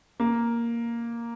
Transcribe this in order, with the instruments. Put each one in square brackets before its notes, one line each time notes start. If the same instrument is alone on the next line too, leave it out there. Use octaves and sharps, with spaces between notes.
[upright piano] A#3